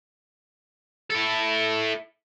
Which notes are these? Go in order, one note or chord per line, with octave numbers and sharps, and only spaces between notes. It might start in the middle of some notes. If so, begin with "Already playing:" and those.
E4 A4